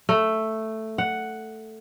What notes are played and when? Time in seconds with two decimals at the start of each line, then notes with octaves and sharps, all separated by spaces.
0.09 A3
0.98 F#5